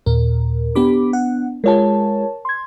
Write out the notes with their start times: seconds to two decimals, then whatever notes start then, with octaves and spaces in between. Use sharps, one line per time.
0.06 D#2 A#2 A#4
0.75 B3 D4 G4 B5 D6
1.13 F#5
1.64 G#3 F4 G#4 A#4 C#5 A5
2.45 C6 G#6